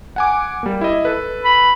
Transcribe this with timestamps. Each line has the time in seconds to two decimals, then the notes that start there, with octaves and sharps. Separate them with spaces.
0.16 F#5 G#5 D6
0.63 G3 A#3
0.81 E4 D#5
1.05 A4 B4
1.45 B5